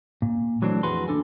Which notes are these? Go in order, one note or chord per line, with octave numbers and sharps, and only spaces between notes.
A#2
E3 F#3 A3 C4 D4
F2 E3 F#4 G#4 B4 C6
D#2 F3 D4 A4 G#5